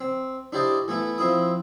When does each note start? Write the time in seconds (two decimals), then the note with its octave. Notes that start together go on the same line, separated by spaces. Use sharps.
0.01 C4
0.53 D4 E4 G4 C5 D5 D#5
0.88 E3 A3 B3 E4
1.18 F3 C4 E4 D#6